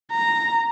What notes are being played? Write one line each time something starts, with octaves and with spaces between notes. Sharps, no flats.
A#5